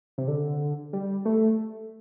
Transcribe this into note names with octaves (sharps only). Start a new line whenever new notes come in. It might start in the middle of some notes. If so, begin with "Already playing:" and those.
C3
D3
G3
A3